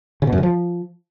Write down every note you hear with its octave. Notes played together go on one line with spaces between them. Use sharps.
C#3
B2
F#2
C#3
F3